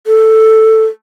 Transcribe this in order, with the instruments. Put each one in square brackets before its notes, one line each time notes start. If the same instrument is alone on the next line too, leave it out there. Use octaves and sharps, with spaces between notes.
[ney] A4